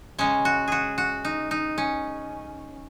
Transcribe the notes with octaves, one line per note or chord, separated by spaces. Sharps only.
C#3 G#3 C#4
F#4
F#4 G#4
F#4
D#4
D#4
C#4